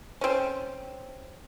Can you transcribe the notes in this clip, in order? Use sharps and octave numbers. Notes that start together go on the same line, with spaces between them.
C4 C#4